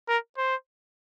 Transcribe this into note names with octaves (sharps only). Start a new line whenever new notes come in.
A#4
C5